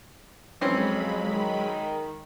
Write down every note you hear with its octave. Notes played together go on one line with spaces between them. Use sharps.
F2 E3 F#3 G#3 C4 C#4 B5
D#3